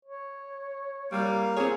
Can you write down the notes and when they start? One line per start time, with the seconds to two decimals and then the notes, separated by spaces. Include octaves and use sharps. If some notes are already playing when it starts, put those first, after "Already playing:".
0.05 C#5
1.12 G3 A#3 F5
1.57 C4 G#4 C#5